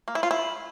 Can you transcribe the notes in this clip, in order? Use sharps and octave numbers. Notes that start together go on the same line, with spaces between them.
A#3
E4
F4
E4